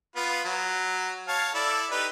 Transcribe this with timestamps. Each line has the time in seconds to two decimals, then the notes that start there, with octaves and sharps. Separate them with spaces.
0.16 B3 F4 B5
0.45 F#3
1.28 C#5 F5 A5
1.54 E4 A4 D5
1.91 D#4 G4 B4